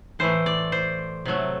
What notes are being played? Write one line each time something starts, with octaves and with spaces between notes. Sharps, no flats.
A2 E3 A3 C5
D5
C5
C3 F#3 A3